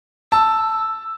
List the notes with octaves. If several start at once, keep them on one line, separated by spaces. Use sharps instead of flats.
A5 E6